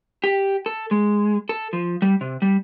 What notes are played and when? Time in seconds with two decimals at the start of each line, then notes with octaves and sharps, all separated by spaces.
0.24 G4
0.66 A4
0.91 G#3
1.49 A4
1.73 F3
2.02 G3
2.21 C3
2.42 G3